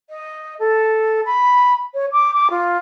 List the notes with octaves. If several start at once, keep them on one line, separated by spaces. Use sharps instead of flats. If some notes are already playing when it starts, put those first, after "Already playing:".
D#5
A4
B5
C#5
D6
D6
F4